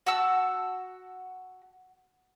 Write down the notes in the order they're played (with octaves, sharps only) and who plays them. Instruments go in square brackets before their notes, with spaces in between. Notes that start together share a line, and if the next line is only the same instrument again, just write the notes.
[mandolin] F#4 F#5 A5 E6